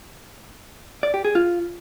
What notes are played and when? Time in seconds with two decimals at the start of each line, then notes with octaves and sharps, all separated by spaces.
1.03 D5
1.14 G4
1.25 G#4
1.35 F4